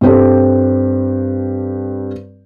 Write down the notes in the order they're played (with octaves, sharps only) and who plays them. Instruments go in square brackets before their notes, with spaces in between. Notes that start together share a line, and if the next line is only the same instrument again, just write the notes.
[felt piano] G2 G3 C4 G4 A4